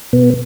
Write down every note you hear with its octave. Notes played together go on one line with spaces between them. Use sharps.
B2 B3